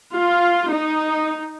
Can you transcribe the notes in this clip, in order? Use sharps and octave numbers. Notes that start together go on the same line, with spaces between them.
F4
D#4